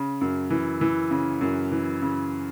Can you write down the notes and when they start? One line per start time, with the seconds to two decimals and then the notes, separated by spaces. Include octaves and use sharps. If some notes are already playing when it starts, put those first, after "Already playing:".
Already playing: C#3
0.21 F#2
0.51 E3
0.81 E3
1.11 C#3
1.41 F#2
1.72 E3
2.02 C#3